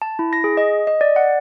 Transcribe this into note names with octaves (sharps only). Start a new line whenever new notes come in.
A5
E4
A#6
G#4
D#5
D#5
D5
F#5